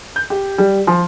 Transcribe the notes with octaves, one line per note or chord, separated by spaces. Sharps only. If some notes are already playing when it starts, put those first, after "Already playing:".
G6
G4
G3
F3